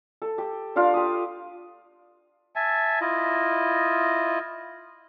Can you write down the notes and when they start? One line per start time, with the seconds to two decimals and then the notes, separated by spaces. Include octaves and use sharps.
0.22 A4
0.38 G4
0.76 D4 F4 D5 F5
0.94 G4 D#6
2.56 E5 G#5 A5
3.01 E4 F4 D#5